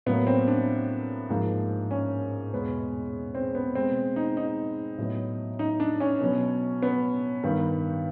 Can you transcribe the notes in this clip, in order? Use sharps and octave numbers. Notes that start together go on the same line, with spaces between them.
A2 F#3 A#3 B3
C4
D4
G#2 F3 A#3
C#4
E2 B2 G#3 B3
C4
B3
B2 G#3 B3 C4
D#4
D#4
A2 F#3 B3
D#4
D4
C#4
B2 F#3 B3
B3
G2 D#3 G3 B3